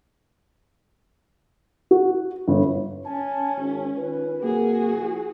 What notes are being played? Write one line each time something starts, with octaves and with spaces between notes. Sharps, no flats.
F#4
G1
C#4 G#5 A5
G#1
D#3 F4 B4
C3 F#3 A#3 F#4 G#4
F3 E4